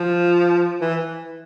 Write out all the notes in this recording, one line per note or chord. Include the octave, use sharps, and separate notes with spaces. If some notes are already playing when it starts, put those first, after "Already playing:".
Already playing: F3
E3